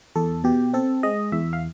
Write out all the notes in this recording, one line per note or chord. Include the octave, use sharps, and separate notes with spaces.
E2 A4
B2 G4
C4 A4
G#3 D#5
E2 E5
F5